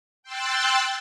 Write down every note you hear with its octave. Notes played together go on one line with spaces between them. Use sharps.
G5 C6 E6 F#6 A6